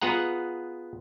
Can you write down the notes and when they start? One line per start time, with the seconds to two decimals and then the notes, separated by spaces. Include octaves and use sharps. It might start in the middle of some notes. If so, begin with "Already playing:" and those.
0.01 B3 F4 G#4 F#5 A#5